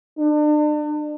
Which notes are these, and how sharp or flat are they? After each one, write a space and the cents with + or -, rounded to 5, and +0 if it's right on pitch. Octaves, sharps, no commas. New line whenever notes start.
D4 +40